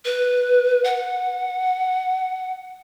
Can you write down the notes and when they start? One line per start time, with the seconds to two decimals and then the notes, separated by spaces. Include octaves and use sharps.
0.05 B4
0.84 F#5